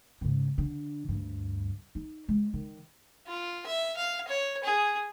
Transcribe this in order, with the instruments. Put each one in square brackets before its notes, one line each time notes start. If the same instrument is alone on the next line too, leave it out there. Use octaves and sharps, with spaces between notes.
[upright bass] G#2 C#3
D3
D2 G2
D#4
G#3
D#3
[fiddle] F4
E5
F5
C#5
G#4